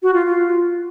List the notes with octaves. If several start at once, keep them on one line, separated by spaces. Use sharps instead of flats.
F#4
F4
F4